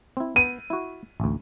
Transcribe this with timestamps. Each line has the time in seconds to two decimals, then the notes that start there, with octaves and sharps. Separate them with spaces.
0.17 C4 E4
0.36 B3 D#7
0.70 E4 F#4
1.20 A1 D2